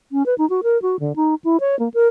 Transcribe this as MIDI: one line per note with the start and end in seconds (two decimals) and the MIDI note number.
0.12 0.26 61
0.26 0.35 71
0.38 0.48 63
0.50 0.61 66
0.63 0.80 70
0.82 0.99 66
1.00 1.16 50
1.16 1.35 63
1.44 1.60 64
1.60 1.78 73
1.79 1.89 58
1.94 2.08 70